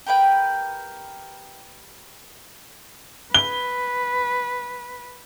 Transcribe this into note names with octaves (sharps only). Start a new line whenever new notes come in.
G4 A#4 B4 G5
B4 G7